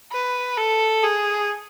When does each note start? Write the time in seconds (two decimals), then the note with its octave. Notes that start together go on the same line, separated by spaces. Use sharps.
0.12 B4
0.57 A4
1.03 G#4